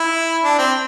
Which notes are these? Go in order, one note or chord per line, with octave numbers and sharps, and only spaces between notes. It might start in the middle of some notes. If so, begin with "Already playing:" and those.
Already playing: E4
D4
C4